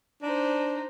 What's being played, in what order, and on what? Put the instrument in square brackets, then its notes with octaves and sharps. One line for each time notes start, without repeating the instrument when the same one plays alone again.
[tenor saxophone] D4 [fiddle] D#4 C5